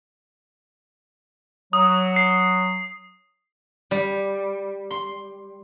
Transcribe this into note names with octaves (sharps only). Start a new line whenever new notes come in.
F#3 D#6
C7
G3
C6